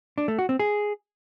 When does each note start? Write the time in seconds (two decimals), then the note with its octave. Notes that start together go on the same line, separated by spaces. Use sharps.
0.18 D4
0.28 A3
0.39 F#4
0.49 C4
0.59 G#4